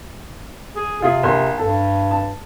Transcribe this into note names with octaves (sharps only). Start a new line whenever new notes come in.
G#4
C3 F4 G#4
A#1 C6
G2 A4
A5